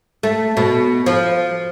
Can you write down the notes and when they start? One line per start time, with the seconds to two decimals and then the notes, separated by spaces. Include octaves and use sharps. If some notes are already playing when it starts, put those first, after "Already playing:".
0.23 A3
0.57 B2
1.06 F3